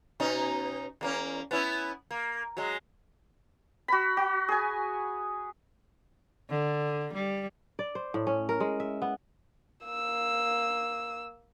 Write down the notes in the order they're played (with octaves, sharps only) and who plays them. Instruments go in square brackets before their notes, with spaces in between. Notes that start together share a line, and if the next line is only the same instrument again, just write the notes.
[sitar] B2 C#4 D#4
E2 A#3 C#4
B3 C#4 E4
A#3
F#3 G#3
[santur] F#4 B5
F#4
G#4 G#5
[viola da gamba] D3
G3
[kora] D5
C5
A2
C#4
A#4
G#3
E5
B3
[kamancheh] A#3 E6